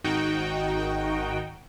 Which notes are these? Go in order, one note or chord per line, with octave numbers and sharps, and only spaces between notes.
G#1 D#3 D#4 F#4 G5